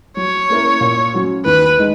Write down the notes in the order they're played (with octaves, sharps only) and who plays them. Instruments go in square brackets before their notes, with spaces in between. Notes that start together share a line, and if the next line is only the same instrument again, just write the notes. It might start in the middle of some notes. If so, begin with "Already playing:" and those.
[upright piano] F#3 [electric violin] C#5
[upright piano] A#3 C#4 E4 A#4
A#2
F#3 C#4 F#4
[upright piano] D#2 [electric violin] B4
[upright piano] D#3 G#3 D#4